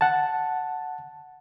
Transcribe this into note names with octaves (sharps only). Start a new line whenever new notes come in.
F#5 A5